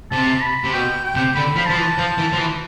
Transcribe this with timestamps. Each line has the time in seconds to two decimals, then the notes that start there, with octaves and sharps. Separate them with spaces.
0.11 C3 A5
0.42 B5
0.64 C3
0.73 B2 G5
1.04 G5
1.15 C3
1.35 D3 B5
1.56 F3
1.59 B5
1.66 F3 A5
1.77 E3
1.98 F3
2.18 E3
2.33 F3
2.38 E3